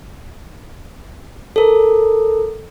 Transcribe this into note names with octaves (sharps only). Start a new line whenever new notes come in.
A4 A#4